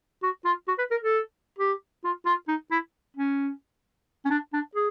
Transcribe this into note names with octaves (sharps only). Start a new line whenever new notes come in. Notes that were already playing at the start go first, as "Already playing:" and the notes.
F#4
F4
F#4
B4
A#4
A4
G4
F4
F4
D#4
E4
C#4
C#4
D4
D4
G#4